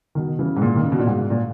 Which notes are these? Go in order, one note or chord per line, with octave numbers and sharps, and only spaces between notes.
B2 D#3
C#3 E3
G#2
A#2
D#3
C#3
B2
A#2
G#2
A#2